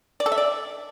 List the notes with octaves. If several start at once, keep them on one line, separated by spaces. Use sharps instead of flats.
D5
A4
E5
D5